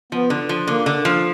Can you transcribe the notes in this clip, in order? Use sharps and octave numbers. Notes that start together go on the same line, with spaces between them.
F3 B3
D3
F3
D3 A#3
D3
F3